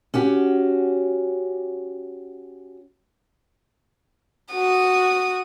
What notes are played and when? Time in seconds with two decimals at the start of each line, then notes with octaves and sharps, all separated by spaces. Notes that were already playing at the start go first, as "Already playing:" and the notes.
0.14 C#4 F#4 G4
4.53 F#4 D#6